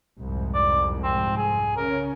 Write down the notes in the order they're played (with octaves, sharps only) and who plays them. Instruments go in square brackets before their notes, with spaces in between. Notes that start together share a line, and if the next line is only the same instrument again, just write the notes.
[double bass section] C2 F2 G#2
[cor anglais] D5
C4
G#4
[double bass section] C#3 C#4 [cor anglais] A#4